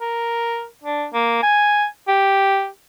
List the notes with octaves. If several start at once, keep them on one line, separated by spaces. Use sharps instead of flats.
A#4
D4
A#3
G#5
G4